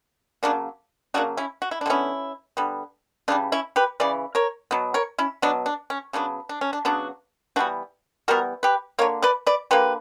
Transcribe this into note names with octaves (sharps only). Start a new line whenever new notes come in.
C#3 F#3 A#3 D4
C#3 F#3 A#3 D4 F#4
C#4 E4
F#4
E4
D4
D3 G3 B3 C#4 E4
D3 G3 B3
C#3 E3 G3 D4
C#4 E4
G4 B4
C#3 E3 D5
A#4 C#5
B2 F#3 B3
A#4 C#5
C#4 E4
B2 F#3 B3 D4
D4
C#4
C#3 F#3 B3 D4
D4
C#4
D4
C#3 F#3 B3 D4 F#4
E3 G3 B3 D4 F#4
E3 G3 B3 F#4 A#4
G4 B4
D3 A#3 A#4 C#5
B4 D5
B4 D5
D3 A#3 G4 B4